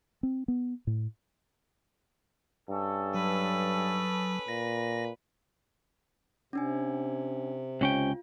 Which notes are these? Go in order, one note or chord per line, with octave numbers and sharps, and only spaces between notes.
C4
B3
A2
G2 C#4 G#4 A4
F#3 B4
A#2 A#6
C3 C#4 D4 G#5
C#2 C#4 F4 G5